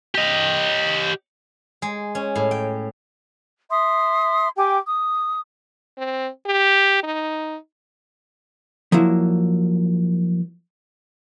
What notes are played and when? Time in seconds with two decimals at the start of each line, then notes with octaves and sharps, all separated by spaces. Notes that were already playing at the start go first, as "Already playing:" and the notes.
0.15 G4 D#5
1.82 G#3
2.15 C#4
2.36 A2
2.51 G5
3.70 E5 C6 D#6
4.57 G4 G5 G#5 D6
4.88 D#6
5.98 C4
6.46 G4
7.03 D#4
8.92 F3 F#3 A#3 E4